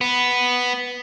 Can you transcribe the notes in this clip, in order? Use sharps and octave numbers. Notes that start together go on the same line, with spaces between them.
B3